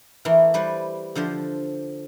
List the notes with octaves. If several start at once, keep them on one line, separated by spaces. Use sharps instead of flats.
E3 A3 A#3
G3 B4 C5 D5
D3 F3 D4 C5